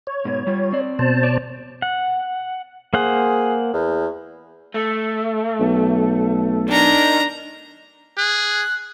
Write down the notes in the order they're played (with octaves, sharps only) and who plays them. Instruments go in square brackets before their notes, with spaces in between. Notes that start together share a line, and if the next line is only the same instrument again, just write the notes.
[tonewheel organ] C#5
[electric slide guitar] G#2 B2
G3 F4
C4 D5
[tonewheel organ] B2 C5 A5
[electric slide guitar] C#5 D5
[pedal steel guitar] F#5
[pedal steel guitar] A#3 C5 F#5 [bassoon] G#4
[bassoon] E2
[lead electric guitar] A3
[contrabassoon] B1
[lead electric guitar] D#3 [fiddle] D4 A#5
[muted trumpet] G#4 [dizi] F#6